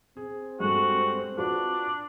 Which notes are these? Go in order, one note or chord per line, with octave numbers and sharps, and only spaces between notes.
C4 G#4
G2 G#3 F#4 A4
D4 F4 F#4 B4